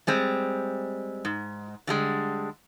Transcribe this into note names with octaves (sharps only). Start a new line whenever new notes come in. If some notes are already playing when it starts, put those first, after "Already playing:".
G3 G#3 C4
G#2
D3 G3 G#3